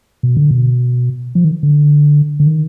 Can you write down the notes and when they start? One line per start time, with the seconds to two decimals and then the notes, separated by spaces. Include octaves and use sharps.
0.23 B2
0.37 D3
0.51 B2
1.35 F3
1.44 D#3
1.63 D3
2.40 D3
2.47 D#3